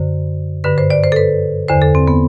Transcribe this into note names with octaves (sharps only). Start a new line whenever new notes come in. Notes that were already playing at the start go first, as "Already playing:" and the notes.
Already playing: F#2 D3 C5
G2 D3 B4
C5
D5
C5
A4
B4
E2 D3 C5
A4
C4
B3